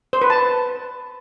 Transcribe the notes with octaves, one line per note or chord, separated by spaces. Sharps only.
C5
B4
A5